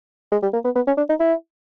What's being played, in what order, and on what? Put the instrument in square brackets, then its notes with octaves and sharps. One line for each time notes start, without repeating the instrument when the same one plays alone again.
[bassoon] G#3
G3
A#3
B3
B3
C#4
D4
D#4
E4